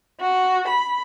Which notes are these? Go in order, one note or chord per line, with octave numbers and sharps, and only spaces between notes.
F#4
B5